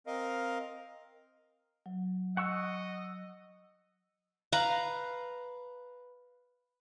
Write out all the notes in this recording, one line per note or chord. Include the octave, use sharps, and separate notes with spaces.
C4 A#4 D#5 F5
F#3
D#5 F#5 C#6 E6
B4 F5 A#5